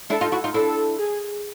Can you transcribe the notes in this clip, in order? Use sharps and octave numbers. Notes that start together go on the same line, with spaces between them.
D4 E4 A4
D#4 F4
E4 F#4
D#4 F4
D4 E4 A4
G#4